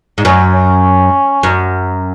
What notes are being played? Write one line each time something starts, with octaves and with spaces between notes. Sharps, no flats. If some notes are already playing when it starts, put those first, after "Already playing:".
G#2
F#2 C#4
C#4
F#2